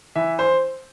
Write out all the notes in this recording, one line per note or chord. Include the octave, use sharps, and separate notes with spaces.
E3 E5
C5